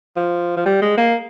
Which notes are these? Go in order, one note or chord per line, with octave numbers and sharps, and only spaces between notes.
F3
F3
G3
G#3
A#3